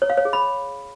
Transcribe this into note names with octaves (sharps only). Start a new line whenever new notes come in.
C#5
F5
C#5
G#4
B5